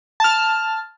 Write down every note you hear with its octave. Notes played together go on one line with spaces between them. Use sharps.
A5 F6